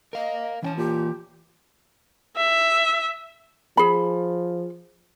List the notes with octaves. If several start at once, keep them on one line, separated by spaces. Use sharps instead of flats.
A#4 D#5 F5
E3 C#4 G5 A5
A#2 G4
E5
F3 G#4 B5